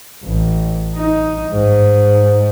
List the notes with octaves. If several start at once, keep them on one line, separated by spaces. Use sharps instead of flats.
A1
D#4
G#2